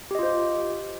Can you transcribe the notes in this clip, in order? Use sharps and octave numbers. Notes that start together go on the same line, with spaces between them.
F4 G4 C5 D#5